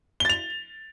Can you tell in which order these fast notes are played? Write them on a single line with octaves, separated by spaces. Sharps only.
G7 A6 F7